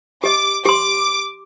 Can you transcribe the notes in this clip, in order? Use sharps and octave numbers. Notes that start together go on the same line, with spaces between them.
G4 D#5 D6
G4 C6 D6